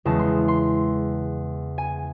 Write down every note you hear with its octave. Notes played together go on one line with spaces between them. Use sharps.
E2 C#3 G#3 A5
C6
C6
G#5